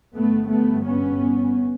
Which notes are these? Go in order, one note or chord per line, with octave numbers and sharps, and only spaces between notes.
G1 G2 A3 B3
A3 B3
B3 C#4